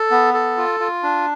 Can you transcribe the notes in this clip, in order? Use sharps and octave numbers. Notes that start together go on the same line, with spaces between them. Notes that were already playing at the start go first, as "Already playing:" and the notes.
Already playing: A4
B3
A4
F4
F4
D4